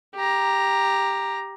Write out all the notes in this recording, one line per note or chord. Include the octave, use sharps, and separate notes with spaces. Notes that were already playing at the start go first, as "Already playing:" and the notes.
G4 A#5